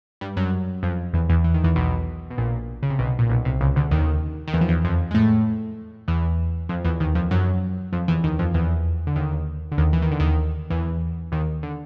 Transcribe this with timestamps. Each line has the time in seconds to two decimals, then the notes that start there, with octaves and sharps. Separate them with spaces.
0.21 G2 G3
0.37 F#2 F#3
0.83 F2 F3
1.14 E2 E3
1.29 E2 E3
1.44 E3
1.54 D#3
1.64 E2 E3
1.75 B1 B2
2.30 B2
2.38 A#1 A#2
2.83 C#3
2.90 C3
2.99 B1 B2
3.19 A#2
3.30 B1 B2
3.45 C2 C3
3.61 C#2 C#3
3.76 D2 D3
3.91 D#2 D#3
4.48 D#3
4.53 E2 E3
4.61 F3
4.69 E2 E3
4.84 F2 F3
5.11 G#3
5.14 A2 A3
6.08 E2 E3
6.69 F2 F3
6.85 E2 E3
7.00 D#2 D#3
7.15 F2 F3
7.31 F#2 F#3
7.93 F2 F3
8.08 E2 E3
8.24 D#2 D#3
8.39 F2 F3
8.54 E2 E3
9.07 D3
9.16 D#2 D#3
9.72 D3
9.78 D#2 D#3
9.93 E3
10.02 D#3
10.11 D3
10.20 D#2 D#3
10.70 E2 E3
11.32 D#2 D#3
11.63 D3